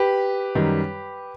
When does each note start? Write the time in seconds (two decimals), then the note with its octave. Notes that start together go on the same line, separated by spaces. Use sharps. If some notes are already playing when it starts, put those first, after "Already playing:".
Already playing: G4 B4
0.55 F#2 D#3 G3